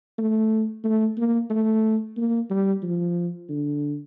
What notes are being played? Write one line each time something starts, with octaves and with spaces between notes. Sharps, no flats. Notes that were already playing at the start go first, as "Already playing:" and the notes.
A3
A3
A#3
A3
A#3
G3
F3
D3